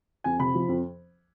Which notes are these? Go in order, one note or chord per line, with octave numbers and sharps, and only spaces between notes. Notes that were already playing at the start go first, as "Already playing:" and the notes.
F2 G#5
C3 B5
F3
F2